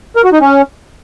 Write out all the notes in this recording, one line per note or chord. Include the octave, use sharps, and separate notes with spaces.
A#4
F#4
D#4
C#4